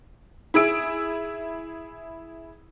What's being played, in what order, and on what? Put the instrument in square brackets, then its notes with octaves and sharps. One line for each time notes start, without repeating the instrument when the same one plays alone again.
[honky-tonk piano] E4 G#4 E6 D7